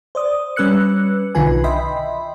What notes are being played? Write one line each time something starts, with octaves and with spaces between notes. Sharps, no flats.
C5 D5 D#6
G3 C#4 B4 E6 F#6 C#7
B1 D3 D#3 F4 B4 G#5
D#5 E5 G5 B5 C6